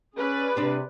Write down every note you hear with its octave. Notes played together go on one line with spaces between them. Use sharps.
C#4 G#4 B4 D5
C3 G3 C4 D4